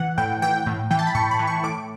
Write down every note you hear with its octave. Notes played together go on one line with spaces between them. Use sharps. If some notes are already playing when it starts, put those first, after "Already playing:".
Already playing: E3 F#5
A2 G5
E3 G5
A2
E3 G5
A5
B5
A2 C#6
B5
E3
C#6
A2 D6